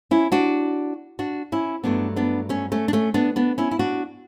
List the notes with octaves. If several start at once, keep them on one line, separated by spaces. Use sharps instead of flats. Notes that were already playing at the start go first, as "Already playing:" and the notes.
C#4 E4
D4 F#4
D4 F#4
C#4 E4
G2 F#3 A3 B3 D4
B3 D4
A3 C#4
A3 C#4
D4
A3 C#4
B3 D4
B3 D4
C#4 E4
E4
D4 F#4